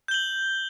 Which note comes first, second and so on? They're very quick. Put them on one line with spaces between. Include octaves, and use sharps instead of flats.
G6 G7 F#7